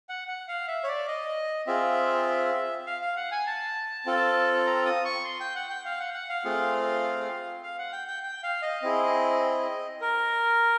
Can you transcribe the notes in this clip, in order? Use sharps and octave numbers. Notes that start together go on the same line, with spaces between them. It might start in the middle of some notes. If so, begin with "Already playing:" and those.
F#5
F#5
F5
E5
C#5
D5
D#5
C4 F4 G#4 E5
F5
F5
F#5
G#5
A5
C4 F4 A4
A#5
D#6
C#6
C6
G5
F#5
G5
F5
F#5
F#5
F5
A3 C4 F4 G#4
F5
F#5
G5
G5
G5
F5
D#5
C4 E4 G#4
A#4